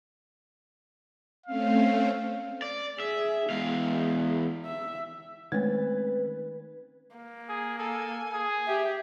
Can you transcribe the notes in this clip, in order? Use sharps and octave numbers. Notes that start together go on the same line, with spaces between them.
A3 C4 C#4 F5
D5
G#4 E5
E2 G#3 F5
E5
D#3 G#3 A3 C4 C#4 B4
A#3
G#4
A4 G#5
G#4
G4 E5